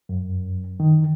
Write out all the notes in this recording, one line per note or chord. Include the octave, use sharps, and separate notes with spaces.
F#2
D#3